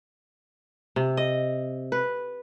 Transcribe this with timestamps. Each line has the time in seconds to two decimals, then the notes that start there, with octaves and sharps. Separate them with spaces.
0.96 C3
1.17 D#5
1.92 B4